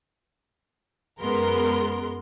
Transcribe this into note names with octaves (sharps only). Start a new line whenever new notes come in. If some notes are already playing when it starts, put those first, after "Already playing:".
F#2 G#3 B3 A#4 C6